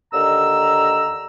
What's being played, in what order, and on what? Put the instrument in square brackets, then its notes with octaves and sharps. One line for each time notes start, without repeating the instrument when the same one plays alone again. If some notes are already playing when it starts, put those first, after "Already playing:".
[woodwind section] D#2 D3 A#5 E6